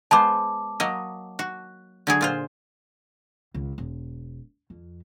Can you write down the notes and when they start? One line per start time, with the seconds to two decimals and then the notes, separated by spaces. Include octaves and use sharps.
0.11 G#3 B3 C5 A5 D6
0.80 F#3 A#3 D#5
1.39 F#4
2.07 D3 F#3 G#4
2.21 A#2 F4 C5
3.54 C#2
3.78 E1
4.70 F2